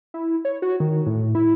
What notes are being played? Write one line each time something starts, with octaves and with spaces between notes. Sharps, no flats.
E4
C#5
F#4
D#3
A2
E4